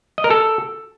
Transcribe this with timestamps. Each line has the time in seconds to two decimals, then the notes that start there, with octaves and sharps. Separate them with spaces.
0.18 D#5
0.24 A#4
0.30 A4